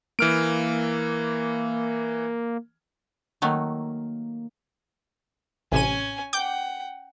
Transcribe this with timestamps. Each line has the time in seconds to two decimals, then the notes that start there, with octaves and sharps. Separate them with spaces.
0.19 E3 A#3 F6 D7
3.42 D#3 F#3 A3 A#3
5.72 A1 C3 C#4 G#5 D#7
6.33 F#5 G5 D6 G6